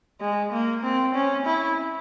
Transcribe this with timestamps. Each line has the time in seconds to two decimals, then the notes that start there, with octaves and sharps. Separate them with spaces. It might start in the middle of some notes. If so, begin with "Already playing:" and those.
0.21 G#3
0.52 A#3
0.83 C4
1.15 C#4
1.45 E4